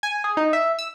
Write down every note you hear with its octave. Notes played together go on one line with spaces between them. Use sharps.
G#5
G#4
D#4
E5
E6